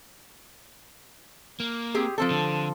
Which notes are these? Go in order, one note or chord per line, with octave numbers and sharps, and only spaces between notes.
A#3
C4 G4 G#4
F3 C4 A4
D3